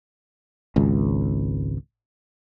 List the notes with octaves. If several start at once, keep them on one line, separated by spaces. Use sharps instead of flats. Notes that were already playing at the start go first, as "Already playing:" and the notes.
G#1 C#2